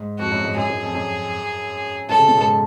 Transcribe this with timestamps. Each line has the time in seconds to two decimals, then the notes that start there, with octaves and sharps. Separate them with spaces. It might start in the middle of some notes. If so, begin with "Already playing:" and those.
Already playing: G#2
0.18 F2 F#4
0.31 F#2
0.44 G#2
0.57 F#2 G#4
0.69 F#2
0.82 F2
0.95 F#2
2.09 F#2 A4
2.18 C#3
2.28 B2
2.37 G#2